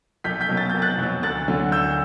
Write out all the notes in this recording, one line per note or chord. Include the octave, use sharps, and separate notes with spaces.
B1 G6 B6
G6 B6
B2 F#3
A6
B1 G6
F#6 A6
B2 F#3
D2 F#6 A6
D3 F#3
D2 E6 G6